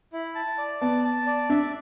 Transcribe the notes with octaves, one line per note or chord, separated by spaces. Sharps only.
E4
A5
D5
B3 A5
A5
D5
D4 E5